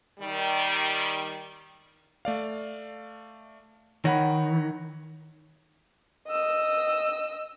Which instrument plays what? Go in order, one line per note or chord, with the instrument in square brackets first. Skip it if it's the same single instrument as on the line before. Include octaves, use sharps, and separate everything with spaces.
[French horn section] D#3 G3
[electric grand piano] A3 D5 F5
[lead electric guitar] D#3 [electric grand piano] C#5 F#5 B5
[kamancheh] D#5 E6